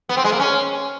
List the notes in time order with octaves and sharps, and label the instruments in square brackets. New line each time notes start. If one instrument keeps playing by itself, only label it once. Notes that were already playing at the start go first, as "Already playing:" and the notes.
[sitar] B3
C4
G#3
A#3
C#4